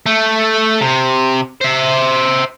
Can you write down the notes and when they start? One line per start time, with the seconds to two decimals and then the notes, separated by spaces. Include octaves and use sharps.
0.06 A3
0.81 C3
1.61 C5 E5